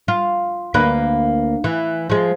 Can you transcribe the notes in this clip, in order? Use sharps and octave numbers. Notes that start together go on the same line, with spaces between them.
F4
D2 A#3 B4
E3
F3 G#3